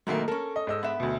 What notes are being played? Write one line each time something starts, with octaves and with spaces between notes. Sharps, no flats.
G#2 B2 D#3 F#3 A3 A#3
C#4 A4 A#4
D#5
G#2 D#5 E6
B3 E5
D2 B2